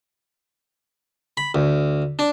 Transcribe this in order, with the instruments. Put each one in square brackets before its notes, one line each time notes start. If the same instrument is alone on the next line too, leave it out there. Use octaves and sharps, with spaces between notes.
[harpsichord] B5
D2
D4